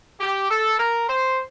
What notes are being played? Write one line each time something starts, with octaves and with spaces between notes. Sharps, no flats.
G4
A4
A#4
C5